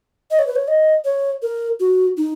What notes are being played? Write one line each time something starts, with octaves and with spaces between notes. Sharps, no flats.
D#5
C#5
B4
C#5
D#5
C#5
A#4
F#4
D#4